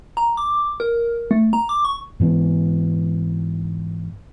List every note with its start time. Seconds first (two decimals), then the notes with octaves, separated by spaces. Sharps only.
0.17 A#5
0.37 D6
0.80 A#4
1.31 A3
1.53 A#5
1.69 D6
1.85 C#6
2.20 G#2 E3 B3